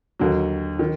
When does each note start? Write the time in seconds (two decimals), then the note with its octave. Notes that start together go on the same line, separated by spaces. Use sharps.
0.19 D#2 D3 F#3
0.79 D#3